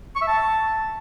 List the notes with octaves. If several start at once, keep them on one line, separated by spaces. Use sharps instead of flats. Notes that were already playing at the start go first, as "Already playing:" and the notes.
C#6
E5
A5